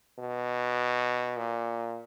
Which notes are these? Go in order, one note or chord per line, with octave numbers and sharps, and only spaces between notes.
B2
A#2